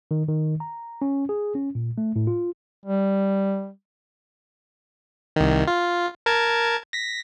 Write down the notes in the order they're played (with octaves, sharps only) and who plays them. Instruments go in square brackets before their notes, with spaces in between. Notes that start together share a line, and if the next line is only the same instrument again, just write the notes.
[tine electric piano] D#3
D#3
A#5
C#4
G#4
C#4
A#2
A3
A2
F4
[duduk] G3
[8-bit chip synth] C2 D#3
F4
A#4 A5 G#6
A#6 B6